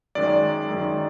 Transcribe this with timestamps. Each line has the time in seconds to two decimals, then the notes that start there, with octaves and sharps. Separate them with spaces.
0.15 F#2 D#3 G#3 D5
0.69 F#2 D#3 G#3